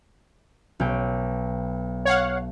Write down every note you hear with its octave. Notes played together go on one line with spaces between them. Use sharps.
B1 G5
C#5 F5 F#5